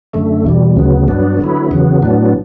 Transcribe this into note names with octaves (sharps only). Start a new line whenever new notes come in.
F#2 D3 A3
E2 B2 G3
D2 C#3 F#3 B3
G2 F#3 B3 D4
D3 F#3 B3 E4
E2 C#3 F#3 B3
A2 F#3 B3 D4